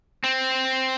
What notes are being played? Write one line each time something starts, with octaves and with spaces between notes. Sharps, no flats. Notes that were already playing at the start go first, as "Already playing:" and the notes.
C4